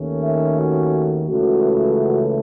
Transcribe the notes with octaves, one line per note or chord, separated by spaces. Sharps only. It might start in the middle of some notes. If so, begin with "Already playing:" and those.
Already playing: D#2 D#3 A3 C#4
E5
F#4
C#2 C#3 E3 A3 F#4